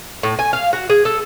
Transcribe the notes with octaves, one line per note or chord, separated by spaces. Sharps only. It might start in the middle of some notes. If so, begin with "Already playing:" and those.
A2
G#5
F5
F#4
G#4
A4